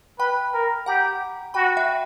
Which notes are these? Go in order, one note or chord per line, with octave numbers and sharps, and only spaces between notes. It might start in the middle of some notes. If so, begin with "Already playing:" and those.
B4 G5 B5
A#4
G4 F#5 A#5
F#4 G5 B5
E5 G5